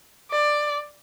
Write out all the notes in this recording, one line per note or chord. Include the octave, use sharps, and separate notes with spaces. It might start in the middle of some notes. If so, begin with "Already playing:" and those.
D5